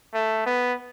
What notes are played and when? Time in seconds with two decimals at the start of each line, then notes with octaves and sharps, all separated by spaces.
0.14 A3
0.46 B3